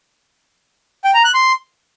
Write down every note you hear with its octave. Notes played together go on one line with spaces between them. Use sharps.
G5
A#5
F#6
C6